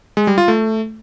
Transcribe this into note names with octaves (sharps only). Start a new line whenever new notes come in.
G#3
G3
F4
A3